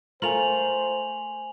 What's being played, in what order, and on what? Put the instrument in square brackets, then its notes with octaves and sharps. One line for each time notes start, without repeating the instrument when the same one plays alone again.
[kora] A3 F4 A#4 [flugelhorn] C5 [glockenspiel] G#5 F7 F#7